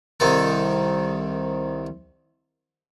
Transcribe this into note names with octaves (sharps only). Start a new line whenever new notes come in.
C2 D#3 A4